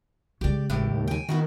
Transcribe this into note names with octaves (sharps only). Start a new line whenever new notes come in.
C#3 G#3 G4 D5
G#1 A2 E3 G4
D#2
G5 G#5
D#3 B3 E4 F#4